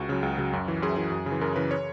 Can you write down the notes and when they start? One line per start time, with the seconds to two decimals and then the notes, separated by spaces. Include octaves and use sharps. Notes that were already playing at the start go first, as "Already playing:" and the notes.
Already playing: C#2 F#4
0.09 C#3 F#3
0.23 C#2
0.38 C#3 F#3
0.53 F#2
0.68 E3
0.82 F#2 G#4
0.97 E3
1.12 F#2
1.26 C#3
1.31 E3
1.41 F#2 A#4
1.56 C#3 E3 B4
1.71 C#5